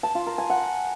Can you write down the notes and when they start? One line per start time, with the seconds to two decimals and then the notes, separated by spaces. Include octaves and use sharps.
0.03 A5
0.15 F4
0.27 A#4
0.38 G#5
0.50 F#5